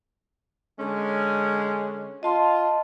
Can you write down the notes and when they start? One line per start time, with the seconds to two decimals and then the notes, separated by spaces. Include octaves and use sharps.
0.79 D3 G#3 C#4
2.23 F4 D#5 A5 C6